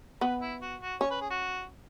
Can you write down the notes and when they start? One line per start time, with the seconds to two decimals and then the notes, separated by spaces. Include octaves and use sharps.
0.21 B3 B4
0.41 E4
0.61 F#4
0.81 F#4
1.01 C#4 C#5
1.10 B4
1.21 G#4
1.30 F#4